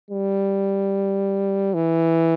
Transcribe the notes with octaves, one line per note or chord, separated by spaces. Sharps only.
G3
E3